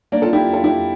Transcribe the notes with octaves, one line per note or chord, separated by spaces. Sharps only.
A#3 D4
F4 A4
E4 G4
F4 A4
E4 G4